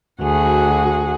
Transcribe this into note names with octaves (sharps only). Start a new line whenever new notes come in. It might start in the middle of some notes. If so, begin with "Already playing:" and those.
D2 F#4 G#4 F#5